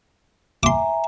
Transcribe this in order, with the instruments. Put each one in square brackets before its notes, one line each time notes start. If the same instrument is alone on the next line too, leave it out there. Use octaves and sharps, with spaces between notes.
[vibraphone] E5 G#5 A#5 [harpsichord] C6 D6